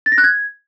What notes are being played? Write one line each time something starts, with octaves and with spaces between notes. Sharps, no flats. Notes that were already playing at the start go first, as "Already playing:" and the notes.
A6
A#6
F#6
G#6